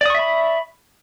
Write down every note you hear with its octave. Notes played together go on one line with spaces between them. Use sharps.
D5 E5 B5 C#6 D#6